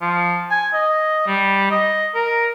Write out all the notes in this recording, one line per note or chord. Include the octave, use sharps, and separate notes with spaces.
F3
G#5
D#5
G3
D#5
A#4